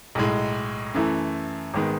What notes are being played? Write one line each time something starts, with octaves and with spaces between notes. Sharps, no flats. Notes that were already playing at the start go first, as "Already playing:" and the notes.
B1 A2 G#3
F#2 E3 A3
G#1 D#3 G#3 B3